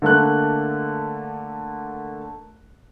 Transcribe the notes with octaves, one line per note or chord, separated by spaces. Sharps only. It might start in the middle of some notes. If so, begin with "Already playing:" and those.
D3 A3 A#3 F#6